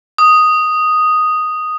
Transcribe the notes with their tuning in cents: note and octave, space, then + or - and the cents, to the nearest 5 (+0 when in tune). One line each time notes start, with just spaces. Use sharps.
D#6 +0